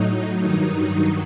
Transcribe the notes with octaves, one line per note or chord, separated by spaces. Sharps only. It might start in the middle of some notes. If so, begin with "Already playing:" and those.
Already playing: A2 F#3 D#4
G2 D#3 F#3 D#4